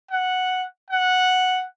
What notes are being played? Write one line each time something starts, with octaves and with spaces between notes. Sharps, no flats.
F#5
F#5